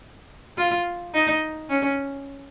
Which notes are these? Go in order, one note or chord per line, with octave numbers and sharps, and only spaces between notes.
F4
D#4
C#4